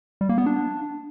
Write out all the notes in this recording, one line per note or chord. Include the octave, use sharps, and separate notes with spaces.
G3
A#3
B3
D4